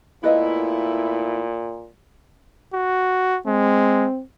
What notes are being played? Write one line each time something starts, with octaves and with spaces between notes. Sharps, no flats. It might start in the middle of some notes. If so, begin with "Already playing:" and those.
A#2 A3 B3 E4 B4 D#5 F5
F#4
G#3 C4